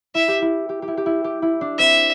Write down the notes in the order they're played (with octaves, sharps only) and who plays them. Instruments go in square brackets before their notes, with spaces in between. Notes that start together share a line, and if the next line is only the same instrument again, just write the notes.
[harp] E4 [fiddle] E5
[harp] G4
E4
G4
G4
E4
G4
E4
G4
E4
D4
[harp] C4 [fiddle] E5